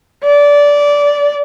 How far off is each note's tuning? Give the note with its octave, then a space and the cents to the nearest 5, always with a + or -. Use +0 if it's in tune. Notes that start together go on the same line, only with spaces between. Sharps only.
D5 -20